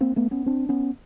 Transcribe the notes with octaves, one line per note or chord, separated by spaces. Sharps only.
A#3 C4
A3 B3
B3 C#4
C4 D4
B3 C#4